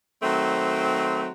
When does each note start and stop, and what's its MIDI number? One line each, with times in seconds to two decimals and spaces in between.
0.22 1.29 51
0.22 1.29 54
0.22 1.29 57
0.22 1.29 60